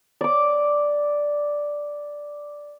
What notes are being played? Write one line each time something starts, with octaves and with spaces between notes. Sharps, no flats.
D5 D6